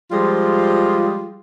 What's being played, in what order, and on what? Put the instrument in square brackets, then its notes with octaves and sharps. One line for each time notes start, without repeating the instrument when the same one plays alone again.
[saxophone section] F3 G3 G#3 F4